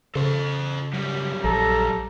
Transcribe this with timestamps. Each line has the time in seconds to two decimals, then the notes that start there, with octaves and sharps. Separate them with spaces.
0.16 C#3 A4 C5
0.94 F#2 G3
1.44 A#1 A4 A#5